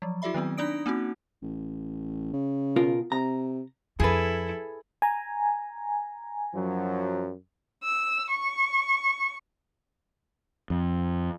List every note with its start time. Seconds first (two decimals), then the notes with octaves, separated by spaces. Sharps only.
0.02 F3 F#3
0.22 E4 F#4 G#4 D5 E5 B5
0.34 D#3 F#3 B3 C4
0.58 D4 D#4 D5 D#6 D7
0.86 A#3 C4 C#4 D#4 F#4
1.42 A1
2.33 C#3
2.76 B2 F4 A#4
3.12 C3 A#5
4.00 F2 E4 G#4 A4 B4
5.02 G#5 A#5
6.54 F#2 F3 F#3
7.82 E6
8.30 C#6
10.70 F2